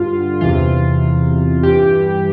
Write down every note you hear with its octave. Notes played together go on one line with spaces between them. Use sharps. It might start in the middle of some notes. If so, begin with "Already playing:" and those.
Already playing: G2 D3 F4
E2 C3 E3 F4
G2 E3 G4